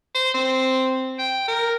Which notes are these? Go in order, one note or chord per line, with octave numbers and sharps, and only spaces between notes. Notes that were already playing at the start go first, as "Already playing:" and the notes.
C5
C4
G5
A#4